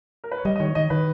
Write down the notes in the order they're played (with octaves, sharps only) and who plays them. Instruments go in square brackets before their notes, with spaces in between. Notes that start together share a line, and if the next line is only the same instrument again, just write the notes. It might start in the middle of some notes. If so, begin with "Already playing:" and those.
[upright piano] A#4
B4
C#5
[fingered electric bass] G3 [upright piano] D#5
[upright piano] D#5
[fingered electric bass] D#3 [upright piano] C#5
[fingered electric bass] D#3 [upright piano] D#5
[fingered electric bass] D#3 [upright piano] B4